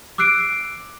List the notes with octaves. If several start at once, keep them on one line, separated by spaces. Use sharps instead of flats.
D6 E6 F#6 C7 D7